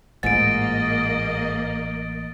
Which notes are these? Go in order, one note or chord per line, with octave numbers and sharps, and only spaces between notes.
A1 G#2 A#3 F4 D#5 A6 D7